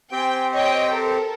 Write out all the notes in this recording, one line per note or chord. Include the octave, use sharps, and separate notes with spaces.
C4 G4 C5 G5 G#5
C#5 D#5 G5
A4 A#4